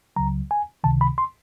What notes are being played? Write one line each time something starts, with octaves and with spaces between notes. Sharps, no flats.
C#2 C#3 F#3 A#5
G#5
C#2 C3 D#3 A5
B5
C6